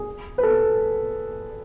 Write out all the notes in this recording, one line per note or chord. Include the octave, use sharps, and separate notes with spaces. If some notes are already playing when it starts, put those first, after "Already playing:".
Already playing: G#4
B4
A4